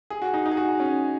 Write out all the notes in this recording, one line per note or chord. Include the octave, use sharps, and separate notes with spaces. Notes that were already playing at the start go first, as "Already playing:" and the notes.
G#4
F#4
D#4
D#4
G#4
F#4
C#4